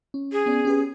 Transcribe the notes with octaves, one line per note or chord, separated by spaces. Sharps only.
C#4
G#4
B3 C#4 D5
C#4 G4 B4